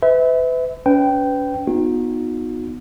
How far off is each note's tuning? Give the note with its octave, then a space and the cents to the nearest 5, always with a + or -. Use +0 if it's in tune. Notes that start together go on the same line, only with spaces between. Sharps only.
B4 +35 E5 -30
C#4 +40 B4 +25 G5 -10
B3 +0 D#4 +0 F#4 -40